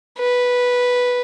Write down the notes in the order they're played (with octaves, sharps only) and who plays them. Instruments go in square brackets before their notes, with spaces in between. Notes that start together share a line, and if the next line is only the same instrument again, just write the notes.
[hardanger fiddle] B4